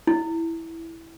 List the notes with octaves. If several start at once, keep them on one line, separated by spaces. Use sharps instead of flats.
E4